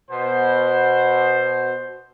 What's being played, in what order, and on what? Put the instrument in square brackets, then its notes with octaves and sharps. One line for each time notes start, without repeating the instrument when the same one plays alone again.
[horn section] B2 C5